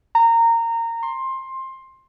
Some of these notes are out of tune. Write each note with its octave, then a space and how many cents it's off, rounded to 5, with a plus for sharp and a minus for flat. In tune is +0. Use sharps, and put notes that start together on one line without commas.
A#5 -20
C6 +15